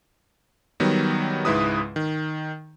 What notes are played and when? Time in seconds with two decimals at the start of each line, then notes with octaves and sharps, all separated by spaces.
0.80 D#3 F#3 G3 B3
1.45 C#2 G#2 G#3 E4 B4 D#6
1.96 D#3